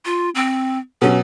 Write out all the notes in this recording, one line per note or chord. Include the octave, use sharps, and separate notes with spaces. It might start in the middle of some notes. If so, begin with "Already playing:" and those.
F4
C4
B2 F#3 C#4